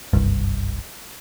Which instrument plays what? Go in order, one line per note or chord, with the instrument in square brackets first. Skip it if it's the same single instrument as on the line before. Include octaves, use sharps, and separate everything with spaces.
[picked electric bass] F#1 C2 G2